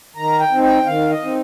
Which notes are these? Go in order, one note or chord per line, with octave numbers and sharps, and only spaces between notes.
D#3 A#5
G5
C4 D#4
G5
D#3 F5
D#5
C4 D#4